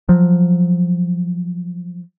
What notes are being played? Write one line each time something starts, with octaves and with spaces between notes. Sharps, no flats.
F3 F#3